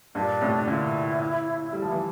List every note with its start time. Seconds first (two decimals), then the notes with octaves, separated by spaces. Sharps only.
0.15 G2 A#2 D4
0.41 A2 C3
0.67 A#2 D3 E4
1.73 G3
1.82 F3
1.92 E3